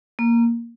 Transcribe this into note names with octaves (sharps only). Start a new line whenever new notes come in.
A#3